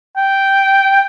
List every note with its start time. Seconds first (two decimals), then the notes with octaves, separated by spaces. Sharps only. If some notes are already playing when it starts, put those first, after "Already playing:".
0.17 G5